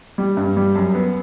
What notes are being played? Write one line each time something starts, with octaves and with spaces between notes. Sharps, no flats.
G3
G2
G3
F#2
B3